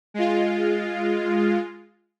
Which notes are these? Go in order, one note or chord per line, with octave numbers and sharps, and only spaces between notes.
G#3 F4